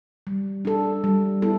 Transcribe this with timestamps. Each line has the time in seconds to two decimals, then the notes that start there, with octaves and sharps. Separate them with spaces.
0.27 G3
0.65 D4 A4
1.04 G3
1.42 B3 E4 A4